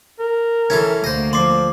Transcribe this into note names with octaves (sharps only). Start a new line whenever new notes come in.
A#4
E3 C#4 E4 A4 G#6
D2 A#3 C5 D#5
F3 D5 C6 D6 C7